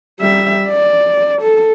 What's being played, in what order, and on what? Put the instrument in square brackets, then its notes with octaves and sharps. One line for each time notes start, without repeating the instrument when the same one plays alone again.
[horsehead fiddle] G3 E5
D5
A4